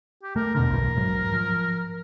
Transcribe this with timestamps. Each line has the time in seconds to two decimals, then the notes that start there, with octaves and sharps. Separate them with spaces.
0.23 G4
0.36 A3 A#4
0.55 E2 B2 D3 A#4
0.70 B1 G2 E3
0.97 G#2 F#3
1.33 F3